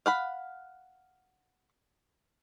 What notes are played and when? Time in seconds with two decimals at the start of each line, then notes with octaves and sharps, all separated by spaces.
0.06 F5 F#5 B5